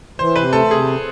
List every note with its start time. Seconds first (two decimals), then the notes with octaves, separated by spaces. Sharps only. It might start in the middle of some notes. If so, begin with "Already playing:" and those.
0.19 E3 C5
0.36 C3 B4
0.53 A3 A4
0.70 C3 G#4